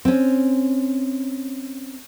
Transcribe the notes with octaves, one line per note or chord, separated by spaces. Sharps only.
C4 C#4